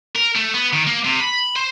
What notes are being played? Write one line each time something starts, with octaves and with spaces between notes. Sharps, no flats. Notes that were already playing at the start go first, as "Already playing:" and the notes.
A#4
A3
B3
D#3
A#3
C3
B5
C5